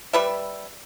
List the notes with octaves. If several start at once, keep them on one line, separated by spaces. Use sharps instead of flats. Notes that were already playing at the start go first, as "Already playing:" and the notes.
G3 B4 E5